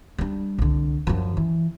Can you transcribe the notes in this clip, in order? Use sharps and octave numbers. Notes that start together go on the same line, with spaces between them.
G3 D4
C2 D3
F#2 F3
E3